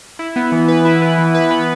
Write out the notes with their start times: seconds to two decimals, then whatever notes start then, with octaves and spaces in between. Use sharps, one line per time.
0.19 E4
0.36 B3
0.52 E3
0.68 B4
0.85 E4
1.02 B3
1.18 E3
1.35 B4
1.51 B3